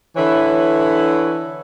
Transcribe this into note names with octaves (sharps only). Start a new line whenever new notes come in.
D3 E3 E4 B4 C#5